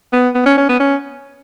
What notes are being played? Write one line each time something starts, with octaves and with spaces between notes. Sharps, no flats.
B3
B3
C#4
C#4
B3
C#4